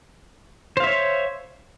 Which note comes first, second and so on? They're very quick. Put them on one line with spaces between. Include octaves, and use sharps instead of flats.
C5 F5 E5 C#5